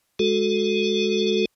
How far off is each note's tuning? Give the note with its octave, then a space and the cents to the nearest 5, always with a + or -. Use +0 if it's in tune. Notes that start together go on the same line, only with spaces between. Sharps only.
G#3 +10 F#4 +0 A4 +0